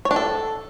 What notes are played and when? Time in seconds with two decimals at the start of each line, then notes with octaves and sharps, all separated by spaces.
0.05 C#5
0.11 D4
0.16 A4